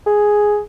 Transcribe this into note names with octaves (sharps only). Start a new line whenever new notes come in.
G#4